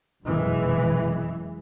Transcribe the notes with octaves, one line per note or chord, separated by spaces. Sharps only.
F1 F#2 B2 E3 G#3